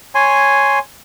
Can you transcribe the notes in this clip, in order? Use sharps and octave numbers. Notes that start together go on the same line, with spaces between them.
C#5 G#5 C6